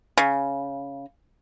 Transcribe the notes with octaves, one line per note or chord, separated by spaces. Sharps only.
C#3